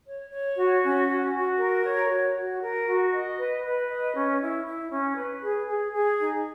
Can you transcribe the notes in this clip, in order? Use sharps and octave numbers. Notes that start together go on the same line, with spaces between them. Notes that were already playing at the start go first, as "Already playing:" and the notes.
C#5
C#5
F#4
C#4
F#4
F#4
A#4
C#5
F#4
F#4
A#4
F#4
D#5
B4
B4
D#5
C#4
E4
E4
C#4
B4
G#4
G#4
G#4
D#4